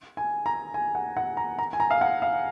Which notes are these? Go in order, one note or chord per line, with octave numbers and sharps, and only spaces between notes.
G#5
A#5
G#5
F#5
F#5
A#5
A#5
G#5
A#5
F5
F#5
F5